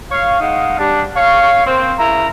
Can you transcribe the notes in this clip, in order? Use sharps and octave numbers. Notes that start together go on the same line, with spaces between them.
C#5 F5
G#3 D#4 F5 F#5
G3 D4
C#5 F5
A#3 C4 C5
C#3 E4 A#4 A#5